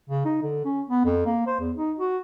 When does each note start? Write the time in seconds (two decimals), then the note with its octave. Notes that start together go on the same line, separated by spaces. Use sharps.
0.10 C#3
0.25 D#4
0.42 D3
0.65 C#4
0.89 B3
1.05 F2
1.25 A#3
1.47 C5
1.59 E2
1.77 D#4
1.98 F#4